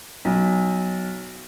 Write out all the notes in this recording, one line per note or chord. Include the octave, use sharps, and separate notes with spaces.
B1